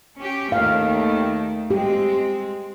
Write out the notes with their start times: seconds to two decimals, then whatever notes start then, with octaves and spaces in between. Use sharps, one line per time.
0.18 C#4 G4
0.52 D#2 D#3 A3 F5
1.71 G#3 C4 G4